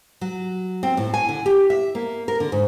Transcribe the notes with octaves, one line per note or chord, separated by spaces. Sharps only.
F#3
C4
A2
G#5
D3
G4
E5
A#3
A#4
D3
G#2